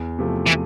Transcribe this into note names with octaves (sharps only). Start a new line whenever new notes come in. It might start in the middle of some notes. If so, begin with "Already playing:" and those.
Already playing: E2
C3 F3 A3
E3